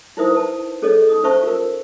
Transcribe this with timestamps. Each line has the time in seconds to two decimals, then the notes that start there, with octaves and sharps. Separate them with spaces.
0.17 D#4 E4 A#4 C5 E5 D#6
0.32 B4 A5
0.82 C#4 G#4 A4 C#5 D#5
1.09 D#4 D#6
1.24 C#4 C5 E5 A5 C#6
1.43 F4 A#4